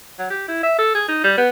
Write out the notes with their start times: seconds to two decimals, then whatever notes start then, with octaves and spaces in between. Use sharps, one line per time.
0.19 F#3
0.30 G4
0.48 E4
0.63 E5
0.78 A4
0.95 G#4
1.08 D#4
1.24 G3
1.37 B3